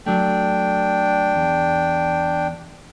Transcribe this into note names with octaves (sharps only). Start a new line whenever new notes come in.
F#3 A3 D4 G5
E2